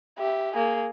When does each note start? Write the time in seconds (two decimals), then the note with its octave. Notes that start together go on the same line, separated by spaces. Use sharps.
0.19 G4 E5
0.54 A#3 G#4